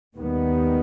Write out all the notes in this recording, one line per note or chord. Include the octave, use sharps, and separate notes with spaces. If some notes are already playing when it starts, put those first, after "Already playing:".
D#2 D#3 G3 B3